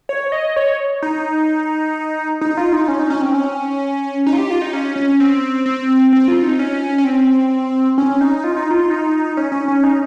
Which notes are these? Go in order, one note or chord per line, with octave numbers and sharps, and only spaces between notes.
C#5
D#5
C#5
D#4
D#4
F4
D#4
C#4
D#4
C#4
C4
C#4
D#4
F4
G4
F4
D#4
C#4
C#4
C4
C4
C4
F4
D#4
C#4
C#4
C4
C#4
D#4
F4
D#4
F4
D#4
C#4
C#4
C#4
D#4